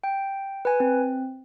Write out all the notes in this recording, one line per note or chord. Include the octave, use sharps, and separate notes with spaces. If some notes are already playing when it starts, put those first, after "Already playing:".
G5
B4 G#5
C4